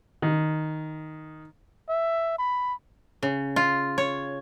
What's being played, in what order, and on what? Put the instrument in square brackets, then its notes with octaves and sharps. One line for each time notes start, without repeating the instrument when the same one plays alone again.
[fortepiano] D#3
[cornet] E5
B5
[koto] C#3
F4
C#5